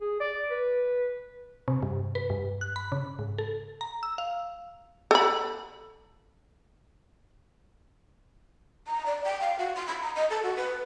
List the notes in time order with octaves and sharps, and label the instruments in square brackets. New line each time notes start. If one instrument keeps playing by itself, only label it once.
[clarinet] G#4
D5
B4
[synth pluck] C3
G2
B4
G2
F#6
B5
C#3
G#2
A4
A#5
E6
F5
[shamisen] A4 B5
[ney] A#5
D5
G5
F5
F#4
C6
B5
A#5
D#5
A4
F#4
B4